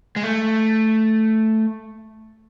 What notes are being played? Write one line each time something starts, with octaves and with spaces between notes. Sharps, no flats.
G#3
A3